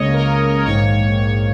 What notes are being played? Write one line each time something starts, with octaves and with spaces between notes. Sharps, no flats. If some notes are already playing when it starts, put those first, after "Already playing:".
Already playing: C#2 C#3 A#3 C#5 D#5
A#4
A#1 G#2 D#3 A#3 C#5
C#5